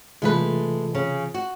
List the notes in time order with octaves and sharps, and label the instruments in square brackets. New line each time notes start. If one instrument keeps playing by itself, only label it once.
[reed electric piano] C3 E3 F4 [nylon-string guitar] G#3 A3 B4
[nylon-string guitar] C#3
F#4